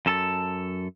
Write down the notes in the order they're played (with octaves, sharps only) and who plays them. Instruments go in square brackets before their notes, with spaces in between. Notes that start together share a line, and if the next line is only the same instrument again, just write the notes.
[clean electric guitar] F#2 A4 A5